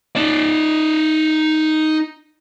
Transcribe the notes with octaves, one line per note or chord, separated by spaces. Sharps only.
D#4 D5